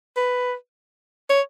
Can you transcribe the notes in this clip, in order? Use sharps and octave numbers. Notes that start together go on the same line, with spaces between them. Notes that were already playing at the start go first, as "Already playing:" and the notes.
B4
C#5